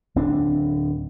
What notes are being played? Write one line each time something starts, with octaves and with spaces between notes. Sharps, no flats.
D1 C4 D4